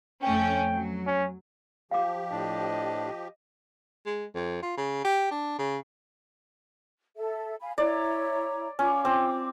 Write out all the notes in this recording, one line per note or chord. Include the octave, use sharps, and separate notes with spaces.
F2 A3 C#4 G5
F#3
C#4
F3 G4 F5 D6
A2 D4 D#5
G#3
F2
F4
C#3
G4
D4
C#3
A4 E5
F5 G#5 B5
E4 C#5 D5 A#5
C#4 F4 D6
C4